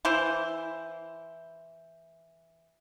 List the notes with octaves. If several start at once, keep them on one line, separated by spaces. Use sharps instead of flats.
E3 E4 C5